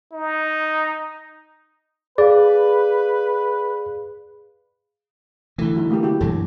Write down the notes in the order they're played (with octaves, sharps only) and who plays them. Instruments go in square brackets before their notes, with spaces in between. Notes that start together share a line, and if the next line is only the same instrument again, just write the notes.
[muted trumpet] D#4
[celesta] G#4 F5 [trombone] B4 [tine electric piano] D5
[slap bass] D3 E3 [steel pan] A3 E4
[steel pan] F#3 D#4 E4
A3 A#3 G4
E4 F#4 G4
[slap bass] E1 G2 F#3 [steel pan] A4